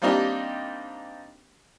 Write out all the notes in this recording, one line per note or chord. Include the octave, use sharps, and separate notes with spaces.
G3 A#3 C4 D4 D#4 G4